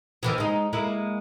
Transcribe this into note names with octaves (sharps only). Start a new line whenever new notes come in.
D#3 E3 F#3
G#3 D#4
G#3 A#3 E4